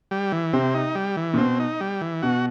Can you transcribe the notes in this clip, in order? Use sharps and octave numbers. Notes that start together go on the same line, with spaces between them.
G3
E3
C3 C4
D#4
G3
E3
A#2
B2 C4
D#4
G3
E3
B2 F#4